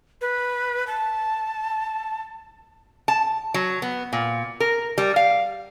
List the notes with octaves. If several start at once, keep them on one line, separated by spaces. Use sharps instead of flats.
B4
A5
A5
F#3
B3
A#2
A#4
G3
F5